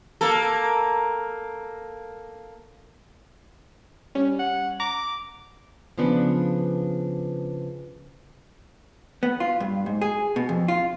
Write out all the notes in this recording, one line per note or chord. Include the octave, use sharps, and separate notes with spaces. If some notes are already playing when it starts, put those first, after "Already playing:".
A#3 A4
G3 C#4
F#5
A#5 D6
C#3 F3 B3 D4
B3
F4
G2
G#2
G#4
B2
F2
F4